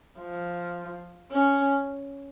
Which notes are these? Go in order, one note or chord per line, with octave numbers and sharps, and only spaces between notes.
F3
C#4